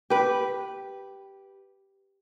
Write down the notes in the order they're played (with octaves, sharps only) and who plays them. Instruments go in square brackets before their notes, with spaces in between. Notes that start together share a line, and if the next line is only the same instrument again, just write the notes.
[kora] G4 B4